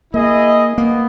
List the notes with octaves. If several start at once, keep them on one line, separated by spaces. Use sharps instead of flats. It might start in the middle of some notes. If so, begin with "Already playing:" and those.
A#3 E4 G#4 D#5
A#3 B3